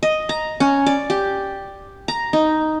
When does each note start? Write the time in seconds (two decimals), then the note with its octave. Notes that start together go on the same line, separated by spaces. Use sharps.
0.03 D#5
0.29 A#5
0.60 C#4
0.86 D5
1.10 G4
2.08 A#5
2.33 D#4